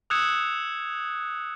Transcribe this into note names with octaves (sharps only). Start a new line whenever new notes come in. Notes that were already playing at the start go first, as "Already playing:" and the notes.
D#6 E6 F#6 G#6 C#7 E7